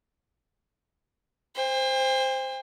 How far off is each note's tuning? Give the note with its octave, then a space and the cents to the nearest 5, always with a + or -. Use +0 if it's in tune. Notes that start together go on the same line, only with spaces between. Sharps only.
C5 +0 G5 +40